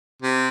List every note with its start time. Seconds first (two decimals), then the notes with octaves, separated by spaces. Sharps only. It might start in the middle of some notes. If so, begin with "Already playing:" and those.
0.22 C3